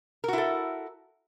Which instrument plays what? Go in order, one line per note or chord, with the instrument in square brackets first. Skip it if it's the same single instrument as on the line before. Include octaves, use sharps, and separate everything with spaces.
[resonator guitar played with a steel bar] A#4
F#4
E4
A4